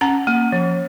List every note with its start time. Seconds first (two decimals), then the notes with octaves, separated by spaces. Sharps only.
0.01 C#4 F#5 A#5
0.27 A#3
0.52 F3